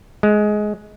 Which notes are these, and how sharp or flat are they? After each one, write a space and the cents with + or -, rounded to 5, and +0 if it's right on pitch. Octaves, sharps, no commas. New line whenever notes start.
G#3 +15